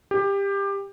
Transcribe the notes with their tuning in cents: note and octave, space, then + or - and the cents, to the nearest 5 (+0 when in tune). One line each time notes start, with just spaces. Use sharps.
G4 +20